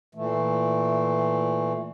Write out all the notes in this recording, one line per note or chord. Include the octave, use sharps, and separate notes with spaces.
A#2 E3 A3